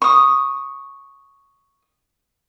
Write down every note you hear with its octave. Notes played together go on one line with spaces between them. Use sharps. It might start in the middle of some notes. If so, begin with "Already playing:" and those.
C#6 D#6